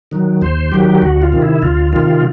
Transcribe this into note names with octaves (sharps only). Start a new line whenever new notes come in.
D#3 F#3
D#2 C5
D#3 F#3 G4
D2 F#4
F4
C3 D#3
E4
D2 F4
C3 D#3 F4